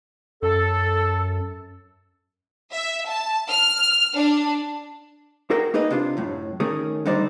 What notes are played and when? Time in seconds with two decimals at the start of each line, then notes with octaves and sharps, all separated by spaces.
0.43 F#2 A4
2.72 E5
3.08 A5
3.50 F6
4.15 D4
5.50 F#4 G#4 A#4 F#5 G5
5.74 A#3 D#4 G#4 B4 D#5
5.90 C3 D4 F4
6.17 F#2 A2
6.60 D#3 A3 C#4 G#4 A#4
7.06 D3 D#3 G3 D#4 C5 D5